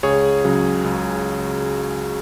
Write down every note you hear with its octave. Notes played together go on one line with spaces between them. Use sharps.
C#2 G#4 C#5
C#3 F#3
C#2